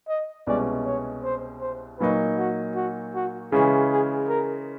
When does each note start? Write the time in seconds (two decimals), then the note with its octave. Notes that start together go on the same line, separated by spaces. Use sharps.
0.08 D#5
0.47 C2 B2 G#3 C#4 D5
0.86 C#5
1.24 C5
1.61 C5
2.00 A#2 F#3 A#3 D#4 B4
2.38 F#4
2.76 F#4
3.15 F#4
3.52 C#3 E3 G#3 C#4 G#4
3.91 G#4
4.29 A#4